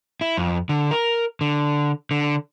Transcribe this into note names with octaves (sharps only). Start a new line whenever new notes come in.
E4
F2
D3
A#4
D3
D3